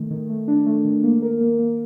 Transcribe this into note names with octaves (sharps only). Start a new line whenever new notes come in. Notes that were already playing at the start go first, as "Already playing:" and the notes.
Already playing: D#3 A3
D#3
A3
D4
A3
D#3
A#3
A#4
A#3
A#3